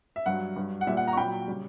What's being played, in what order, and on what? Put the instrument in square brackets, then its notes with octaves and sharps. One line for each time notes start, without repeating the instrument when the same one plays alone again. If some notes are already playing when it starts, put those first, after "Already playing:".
[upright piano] E5
G2 F#3 F#5
G2 F#3
F#5
A#2 G3 E5
F#5
F#5 A#5
C#6
A#2 F#3 G5 B5
C#3 G3